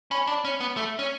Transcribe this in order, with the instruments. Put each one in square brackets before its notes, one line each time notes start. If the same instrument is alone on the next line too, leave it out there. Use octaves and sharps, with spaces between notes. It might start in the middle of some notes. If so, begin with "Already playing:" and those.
[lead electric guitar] C#4 [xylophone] B5
[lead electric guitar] D4
C#4
B3
A3
C#4